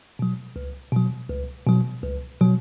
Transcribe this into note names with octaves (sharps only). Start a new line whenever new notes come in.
B2 F#3
C#2
B2 F#3
C#2
B2 F#3
C#2
B2 F#3